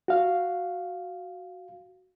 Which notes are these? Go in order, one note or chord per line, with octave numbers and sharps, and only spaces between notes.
F#4 F5